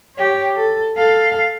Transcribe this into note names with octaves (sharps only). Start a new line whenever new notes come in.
G4 C#5
A4
A4 F5